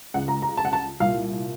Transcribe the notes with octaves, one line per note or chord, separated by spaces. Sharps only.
C#2 C#3 F#5
A#5
A#5
A5
F#5
A5
C2 A#2 F5